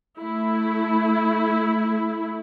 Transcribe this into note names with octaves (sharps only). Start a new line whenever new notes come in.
A3 E4